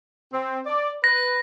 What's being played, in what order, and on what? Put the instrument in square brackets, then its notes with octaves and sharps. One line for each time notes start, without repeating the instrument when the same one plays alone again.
[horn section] C4
D5
[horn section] B4 [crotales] A#6